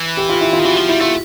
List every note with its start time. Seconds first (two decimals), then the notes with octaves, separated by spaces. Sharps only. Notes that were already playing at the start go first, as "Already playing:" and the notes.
Already playing: E3
0.17 G4
0.29 F4
0.41 E4
0.53 F4
0.59 D#3
0.65 E3 F#4
0.77 F3 F4
0.89 G3 E4
1.00 A3 F4